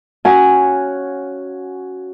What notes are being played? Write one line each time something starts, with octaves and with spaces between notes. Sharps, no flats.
C#4 F#4 F5 F#5 G#5